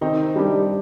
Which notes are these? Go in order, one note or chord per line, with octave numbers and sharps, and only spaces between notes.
D#3 C4 D#4
G3 D4 G4